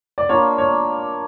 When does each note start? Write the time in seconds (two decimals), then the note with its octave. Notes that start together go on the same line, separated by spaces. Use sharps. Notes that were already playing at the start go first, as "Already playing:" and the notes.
0.18 D5
0.29 A#3 D4 F4 C#5
0.58 C#5